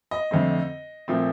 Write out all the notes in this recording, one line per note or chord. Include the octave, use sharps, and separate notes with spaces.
D#5
F2 D3 A3 C4
A#2 F3 A3 C4